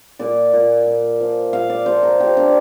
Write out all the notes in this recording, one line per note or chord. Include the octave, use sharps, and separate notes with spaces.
A#2 D5
A#2
A#2
F3
A#2 F5
D5
F3 C5
A#4
F3 G4
D4